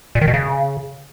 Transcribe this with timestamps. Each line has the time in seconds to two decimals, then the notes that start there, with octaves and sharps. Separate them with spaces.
0.15 A#2
0.21 D#3
0.28 B2
0.34 C#3